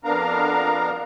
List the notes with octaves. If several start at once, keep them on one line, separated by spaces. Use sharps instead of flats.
F2 B3 D4 A#4 F5 A#5